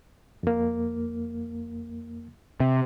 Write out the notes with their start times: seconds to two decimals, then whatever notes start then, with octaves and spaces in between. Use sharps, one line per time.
0.43 F2 A#3
2.60 C3